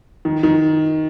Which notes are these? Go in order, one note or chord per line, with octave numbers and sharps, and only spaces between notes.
D#3
D#3